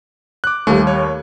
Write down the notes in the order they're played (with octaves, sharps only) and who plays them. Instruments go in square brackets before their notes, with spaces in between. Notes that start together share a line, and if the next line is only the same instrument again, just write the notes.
[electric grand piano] D6 F#6
[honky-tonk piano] D#2 G3 [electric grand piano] A3
[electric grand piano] C#5